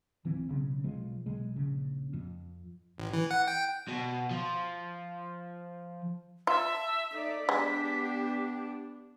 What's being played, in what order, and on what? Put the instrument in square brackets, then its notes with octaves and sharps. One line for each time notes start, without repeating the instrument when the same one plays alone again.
[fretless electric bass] D1 E3 C4
B1 C#3
B1 F3 G#3
B1 G#3
A#1 C#3
F2
[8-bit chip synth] A1
E3
F#5
G5
[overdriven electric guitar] B2
F3
[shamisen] F4 [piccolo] E5 [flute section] A5 E6
[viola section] D#4 D5 [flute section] A4 E5 [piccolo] B6
[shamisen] G#3 [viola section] B3 D4 [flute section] G4